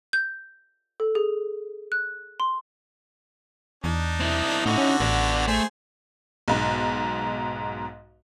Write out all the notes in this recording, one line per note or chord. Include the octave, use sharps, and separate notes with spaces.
G6
A4
G#4
F#6
C6
E2 D4 D#4
C4 E4
A2 D3 D#4 E4 F#4
C#4
A1 B3 D5
A3 G#4 C5
B1 G#2